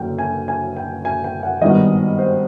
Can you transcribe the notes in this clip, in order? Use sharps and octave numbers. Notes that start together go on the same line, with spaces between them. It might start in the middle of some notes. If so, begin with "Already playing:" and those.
Already playing: F#1 F#2 D3 G5
G#5
G#5
G5
G#5
G5
F#5
G#1 G2 D#3 G3 B3 D#5
C5